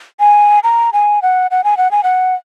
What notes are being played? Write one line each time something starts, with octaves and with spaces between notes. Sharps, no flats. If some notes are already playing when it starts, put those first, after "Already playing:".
G#5
A#5
G#5
F#5
F#5
G#5
F#5
G#5
F#5